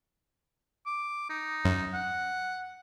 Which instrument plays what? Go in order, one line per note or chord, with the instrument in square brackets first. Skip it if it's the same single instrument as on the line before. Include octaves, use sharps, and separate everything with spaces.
[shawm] D6
D#4
[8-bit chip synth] F#2
[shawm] F#5